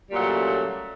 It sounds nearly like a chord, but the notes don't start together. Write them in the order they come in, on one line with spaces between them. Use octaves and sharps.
G3 A#2 F#3 A3 C#3